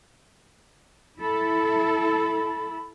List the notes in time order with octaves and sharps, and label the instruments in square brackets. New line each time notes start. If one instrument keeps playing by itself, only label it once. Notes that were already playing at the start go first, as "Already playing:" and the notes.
[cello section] E4 A4 [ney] B5